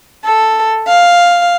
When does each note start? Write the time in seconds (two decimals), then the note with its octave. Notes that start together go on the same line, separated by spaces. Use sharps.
0.24 A4
0.88 F5